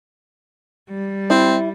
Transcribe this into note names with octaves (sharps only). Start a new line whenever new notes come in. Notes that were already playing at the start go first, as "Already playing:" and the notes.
G3
C4 E4